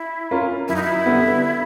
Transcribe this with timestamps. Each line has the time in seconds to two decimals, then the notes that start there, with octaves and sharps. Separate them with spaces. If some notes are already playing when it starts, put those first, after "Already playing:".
Already playing: E4
0.31 C#4 F4 A#4
0.68 F#2 E4
0.76 D#4
0.82 E4
1.06 D3 G3 B3